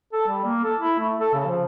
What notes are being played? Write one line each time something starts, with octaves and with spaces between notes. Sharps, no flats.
A4
G3
A#3
A4
E4
A3
A4
C#3
F3